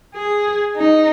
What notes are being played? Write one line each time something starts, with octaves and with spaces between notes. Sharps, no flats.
G#4
D#4